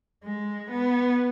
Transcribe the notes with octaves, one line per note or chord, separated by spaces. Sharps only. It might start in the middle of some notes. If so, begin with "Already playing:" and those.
G#3
B3